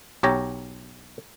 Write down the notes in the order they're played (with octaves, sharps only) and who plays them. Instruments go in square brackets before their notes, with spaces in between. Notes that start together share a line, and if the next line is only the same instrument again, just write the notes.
[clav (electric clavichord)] B1 G4 C#5 A#5